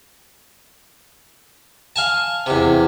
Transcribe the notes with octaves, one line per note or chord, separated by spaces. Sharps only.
F5 G#5 A5
E2 C3